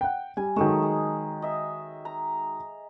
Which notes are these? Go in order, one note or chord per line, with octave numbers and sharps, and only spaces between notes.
F#5 G5
G3 G#5
D#3 F#3 G#3 A3 D#4
G#4
D#5 E5
A#5